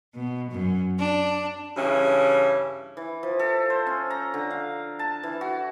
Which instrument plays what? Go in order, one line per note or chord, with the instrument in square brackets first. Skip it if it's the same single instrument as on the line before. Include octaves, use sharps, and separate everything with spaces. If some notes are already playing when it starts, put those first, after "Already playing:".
[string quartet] B2
F#2
D4
[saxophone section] G2 C#3 E3 C#4
[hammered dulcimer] E3
F3
A4
C5
C#4
A#5
D3
F5
A5
E3
F#4